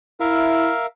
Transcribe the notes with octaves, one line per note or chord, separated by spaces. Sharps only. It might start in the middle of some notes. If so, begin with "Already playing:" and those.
E4 A#4 E5 F5